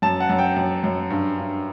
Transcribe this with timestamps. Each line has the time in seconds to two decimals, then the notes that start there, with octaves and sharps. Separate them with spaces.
0.02 F#2 A5
0.20 F#5
0.29 F#2
0.38 G5
0.56 F#2
0.84 F#2
1.10 G2
1.38 G2